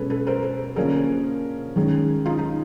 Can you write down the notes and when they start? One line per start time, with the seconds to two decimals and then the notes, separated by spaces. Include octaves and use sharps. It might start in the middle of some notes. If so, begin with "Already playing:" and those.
Already playing: B2 G#3 C#4 A4 B4
0.10 A4 B4
0.27 A#4 C5
0.43 A#4 C5
0.76 D3 F3 A#3 C#4 G#4 A#4
1.76 D#3 G#3 C#4
2.26 D#4 F4
2.39 D#4